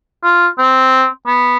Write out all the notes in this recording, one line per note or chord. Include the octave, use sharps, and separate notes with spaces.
F4
C4
B3